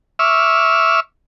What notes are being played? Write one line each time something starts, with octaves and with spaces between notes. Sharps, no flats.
E5 C#6 D6 E6 F6